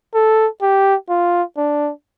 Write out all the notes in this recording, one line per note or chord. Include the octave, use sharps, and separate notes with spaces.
A4
G4
F4
D4